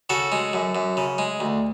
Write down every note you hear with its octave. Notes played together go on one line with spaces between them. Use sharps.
C#3 F#4 A4
G#3
F#2
F#2
C#3
G#3
D2